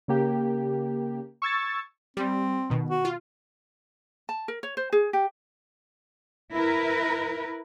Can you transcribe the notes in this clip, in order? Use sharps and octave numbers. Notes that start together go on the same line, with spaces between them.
C#3 A#3 G4
C#6 E6 G#6 A6
G3 C4
B2 D#3
F#4
F4
A5
A#4
C#5
C5
G#4
G4
E4 A#4 B4